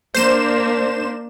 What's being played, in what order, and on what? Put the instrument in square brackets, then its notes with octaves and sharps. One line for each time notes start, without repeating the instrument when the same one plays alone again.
[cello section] A#3 D4 [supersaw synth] C5 E7